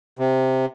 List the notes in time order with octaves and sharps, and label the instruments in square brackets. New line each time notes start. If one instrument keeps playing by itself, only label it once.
[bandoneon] C3